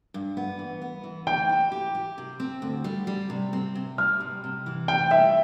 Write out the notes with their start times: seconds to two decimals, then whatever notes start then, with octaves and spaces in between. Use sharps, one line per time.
0.14 G2
0.37 B3
0.59 E3
0.82 B3
1.04 E3
1.27 E3 G5
1.49 E4
1.72 G4
1.95 G4
2.18 C3
2.40 C4
2.62 D2
2.84 G3
3.07 G3
3.30 C3
3.53 C4
3.76 C3
3.98 G3 F6
4.20 C3
4.44 C3
4.66 E3
4.88 C3 G5
5.11 G3 E5